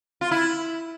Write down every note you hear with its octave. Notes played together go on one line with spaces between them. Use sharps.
F4
E4